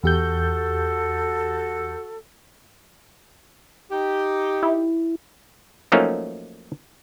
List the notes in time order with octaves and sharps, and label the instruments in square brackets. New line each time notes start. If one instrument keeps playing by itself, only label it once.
[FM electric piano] E2 G4 G6 [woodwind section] F#4 A4
[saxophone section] D#4 G4
[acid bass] E4
[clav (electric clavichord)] F3 F#3 A3 A#3 C#4 D#4